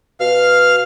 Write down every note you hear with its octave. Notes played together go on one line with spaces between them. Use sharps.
B2 F5 F6